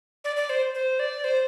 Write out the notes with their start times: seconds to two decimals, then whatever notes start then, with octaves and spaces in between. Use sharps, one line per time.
0.24 D5
0.36 D5
0.49 C5
0.75 C5
0.99 D5
1.24 C5